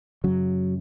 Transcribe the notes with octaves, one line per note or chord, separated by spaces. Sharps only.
F#2 C#3 F#3